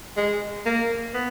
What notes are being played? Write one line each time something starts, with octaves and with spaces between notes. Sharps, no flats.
G#3
A#3
B3